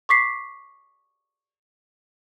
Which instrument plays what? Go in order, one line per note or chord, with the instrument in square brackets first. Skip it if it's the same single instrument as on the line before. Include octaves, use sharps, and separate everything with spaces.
[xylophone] C#6 D6 B6 C7